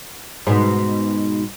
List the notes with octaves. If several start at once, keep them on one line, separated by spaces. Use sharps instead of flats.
G#2 B2